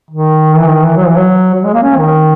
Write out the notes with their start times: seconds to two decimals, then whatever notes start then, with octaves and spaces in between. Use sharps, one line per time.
0.11 D#3
0.56 E3
0.68 D#3
0.83 E3
0.97 F#3
1.07 E3
1.16 F#3
1.55 F#3
1.64 G#3
1.74 A#3
1.83 C#4
1.98 D#3